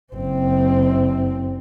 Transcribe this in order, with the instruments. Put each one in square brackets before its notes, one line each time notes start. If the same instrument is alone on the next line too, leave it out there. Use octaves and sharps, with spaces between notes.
[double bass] F#1 C4